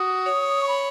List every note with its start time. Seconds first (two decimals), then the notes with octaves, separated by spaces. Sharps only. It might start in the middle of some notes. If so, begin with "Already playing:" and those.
Already playing: F#4 D#6
0.26 C#5
0.62 C#6
0.67 B5